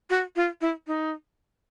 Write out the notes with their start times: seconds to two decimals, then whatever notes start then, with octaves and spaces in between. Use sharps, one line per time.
0.10 F#4
0.36 F4
0.61 E4
0.87 D#4